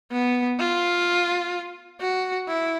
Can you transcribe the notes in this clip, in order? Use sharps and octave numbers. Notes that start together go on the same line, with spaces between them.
B3
F4
F#4
E4